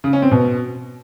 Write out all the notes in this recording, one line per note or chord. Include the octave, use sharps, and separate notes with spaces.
C#3
C#4
C4
B2